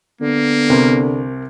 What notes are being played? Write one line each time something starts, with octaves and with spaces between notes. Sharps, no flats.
D3 A#3 B3
C2 C3 A#4